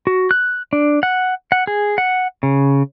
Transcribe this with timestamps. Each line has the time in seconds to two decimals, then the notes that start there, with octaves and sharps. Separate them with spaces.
0.07 F#4
0.31 F#6
0.73 D4
1.03 F#5
1.52 F#5
1.67 G#4
1.98 F#5
2.43 C#3